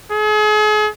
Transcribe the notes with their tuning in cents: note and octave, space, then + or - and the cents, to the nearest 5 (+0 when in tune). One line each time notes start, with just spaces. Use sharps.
G#4 +40